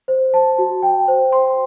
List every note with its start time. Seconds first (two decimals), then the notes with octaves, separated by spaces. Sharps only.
0.08 C5
0.34 A5
0.58 F#4
0.83 G5
1.08 C5
1.32 C6